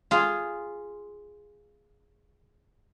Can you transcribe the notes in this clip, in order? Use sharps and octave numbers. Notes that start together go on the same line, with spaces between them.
F4 G#4